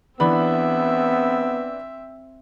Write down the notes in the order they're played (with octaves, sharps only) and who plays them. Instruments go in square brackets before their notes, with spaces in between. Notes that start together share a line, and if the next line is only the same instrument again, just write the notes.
[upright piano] E3 D4 B5 [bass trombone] B3 [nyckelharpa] C4 E5